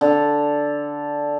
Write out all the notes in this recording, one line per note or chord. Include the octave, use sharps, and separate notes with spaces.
D3